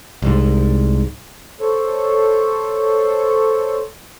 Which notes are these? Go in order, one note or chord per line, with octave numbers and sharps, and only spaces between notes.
C2 G#2
A4 C5 C#5